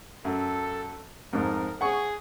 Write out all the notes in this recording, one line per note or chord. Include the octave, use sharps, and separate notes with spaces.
F#2 A4
F2 G#2 A#4
G#4 F#5 C#6